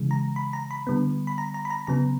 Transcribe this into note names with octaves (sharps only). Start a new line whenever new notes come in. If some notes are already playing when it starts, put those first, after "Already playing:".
Already playing: C#3 E3 G#3
A#5
B5
A#5
B5
D3 G3 B3
B5
A#5
A#5
B5
A#5
C#3 F#3 B3 A#5